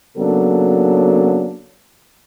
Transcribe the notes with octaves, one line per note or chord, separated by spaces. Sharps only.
C#3 F#3 A#3 B3 D4 A4